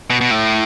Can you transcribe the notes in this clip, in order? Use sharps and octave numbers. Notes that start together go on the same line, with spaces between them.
B2
B2
A2